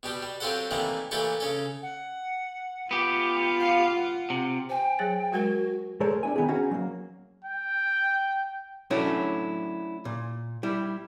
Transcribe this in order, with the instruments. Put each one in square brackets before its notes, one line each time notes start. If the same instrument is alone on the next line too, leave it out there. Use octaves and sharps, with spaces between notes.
[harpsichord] B2 G3 G4
G3
F#3 C4 F4 G4 A4 F#5
C3 D#3 E3 G3 A3 A#3
A#2 E3 A3 G4 A4 C#6
C#3 C#4 A4
[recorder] F#5
[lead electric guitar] B3 G4 [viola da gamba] F4
[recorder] F5
F#5
[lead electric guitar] C3
[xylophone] C5 G#5 [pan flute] G5
[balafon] F#3 G#4 C#5 [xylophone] A6
[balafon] F#3 G#3 A#4 [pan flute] F#4
[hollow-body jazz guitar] G#3 A3 A4 A#4 C5 C#5
D4 E4 G#5
D#3 B3 E4 G#4
C#4 D#4 F#4 G#4
F#3 A#3
[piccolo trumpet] G5
[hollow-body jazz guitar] F#3 A3 C#4 D4 E4
A#2
G3 E4